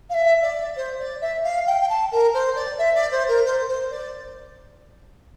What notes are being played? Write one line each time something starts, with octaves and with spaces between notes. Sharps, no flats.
F5
E5
D5
C5
D5
E5
F5
G5
G5
A5
A#4
C5
D5
E5
D5
C5
A#4
C5
C5
D5